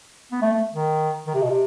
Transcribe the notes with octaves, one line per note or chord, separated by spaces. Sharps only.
B3
A3
A3
D#3
D#3
C3
B2
C3